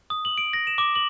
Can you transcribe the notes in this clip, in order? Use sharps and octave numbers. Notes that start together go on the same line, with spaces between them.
D#6
F#7
D7
A#6
E7
D6
F#7